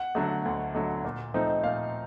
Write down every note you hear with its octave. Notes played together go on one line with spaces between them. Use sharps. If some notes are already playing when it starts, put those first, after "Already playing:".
Already playing: F#5
D3 F#3 A3
D2
D3 F#3 A3
A#2
F3 A3 C4 D#4
A#2 F5